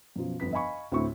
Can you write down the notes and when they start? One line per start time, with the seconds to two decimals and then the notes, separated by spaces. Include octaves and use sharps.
0.16 F#2 B2 F3
0.40 G1 F2 B3 B6
0.53 D#5 F5 G#5 B5 C#6
0.92 D2 A2 C4 E4 C#6